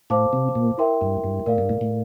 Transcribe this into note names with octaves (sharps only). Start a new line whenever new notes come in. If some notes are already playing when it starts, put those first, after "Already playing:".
A2 C5 F5 A5 D6
C3
A#2
E4 A#4 E5 G5 C6
G2
G2
A2 A#4 D5 F5
G2
A2
A2